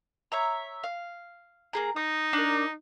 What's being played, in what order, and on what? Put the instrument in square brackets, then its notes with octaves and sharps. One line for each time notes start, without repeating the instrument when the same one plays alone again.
[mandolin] C#5 E5 A#5
F5
A#3 G#4 A#5
[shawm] D#4 [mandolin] D#6
[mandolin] D4 A#4